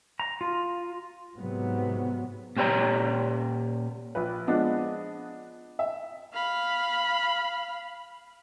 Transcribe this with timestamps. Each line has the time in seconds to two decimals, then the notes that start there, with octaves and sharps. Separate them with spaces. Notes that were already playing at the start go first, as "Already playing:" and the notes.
0.20 A#5
0.41 F4
1.36 G#2 C3 F#3 B3
2.56 A#2 G4 C5 C#5 A#5
4.15 A#1 B4
4.47 F3 G#3 B3 D4 D#5
5.79 E5
6.34 F5 B5